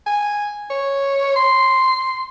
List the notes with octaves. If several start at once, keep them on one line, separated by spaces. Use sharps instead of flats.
G#5
C#5
C6